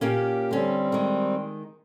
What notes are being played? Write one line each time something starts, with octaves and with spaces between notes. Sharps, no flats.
A#2 A#3 C#4 G4
D3 G3 C4 C#4
D#3 G#3